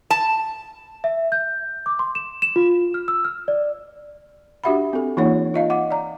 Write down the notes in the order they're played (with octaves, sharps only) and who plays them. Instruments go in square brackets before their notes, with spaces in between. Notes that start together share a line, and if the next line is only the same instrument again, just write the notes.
[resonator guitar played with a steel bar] A5
[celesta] E5
G6
D6
C6
E7
E7
F4
F6
E6
F6
D5
[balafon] D4 F#4 G4 E5 F#5 B5
C4 A4
E3 A#3 D#4 F4 C#5 F#5
F4 D#5 F5
F#5 D6
D5 A#5